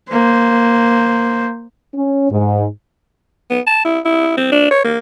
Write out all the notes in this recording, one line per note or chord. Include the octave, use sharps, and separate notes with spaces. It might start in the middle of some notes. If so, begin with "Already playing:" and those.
A#3 C5
C#4
G#2
B3
A5
E4
E4
C4
D4
C#5
A#3